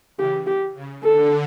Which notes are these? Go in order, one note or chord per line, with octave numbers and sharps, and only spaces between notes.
C#3 E3 G4
G4
C#3
D3 A4